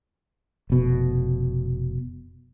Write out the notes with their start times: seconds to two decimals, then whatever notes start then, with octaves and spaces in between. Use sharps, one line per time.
0.70 F1 B2